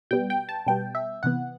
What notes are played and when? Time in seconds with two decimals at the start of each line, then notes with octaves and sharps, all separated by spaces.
0.11 B2 G3 B3 G5
0.30 G5
0.49 A5
0.67 B2 G3 B3 G5
0.95 E5
1.23 C3 E3 B3 F#5